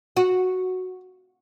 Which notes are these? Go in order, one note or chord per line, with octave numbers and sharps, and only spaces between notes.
F#4